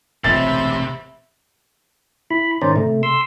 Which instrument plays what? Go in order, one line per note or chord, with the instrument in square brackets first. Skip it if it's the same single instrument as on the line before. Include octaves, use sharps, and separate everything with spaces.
[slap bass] E1 A1 C4 [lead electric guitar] C3 [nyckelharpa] E5 B5 [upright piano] A6
[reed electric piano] E4 [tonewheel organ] B5
[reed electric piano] G#2 D#3 A#5 [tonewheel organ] C#4 C5 D5
[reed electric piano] C3 [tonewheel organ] A3
[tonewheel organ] C6 E6